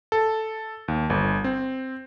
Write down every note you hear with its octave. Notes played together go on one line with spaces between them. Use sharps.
A4
D#2
G1
C4